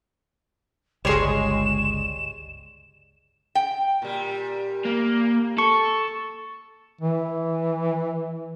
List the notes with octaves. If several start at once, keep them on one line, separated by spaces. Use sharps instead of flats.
G1 C#2 G3 G#3 C#5 C6 E7
G5
A#2 G3
A#3
A4 C#6
E3